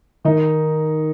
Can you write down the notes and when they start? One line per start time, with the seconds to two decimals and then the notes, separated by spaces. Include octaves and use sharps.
0.25 D#3 D#4